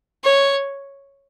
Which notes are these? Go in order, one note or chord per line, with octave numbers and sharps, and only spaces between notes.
C#5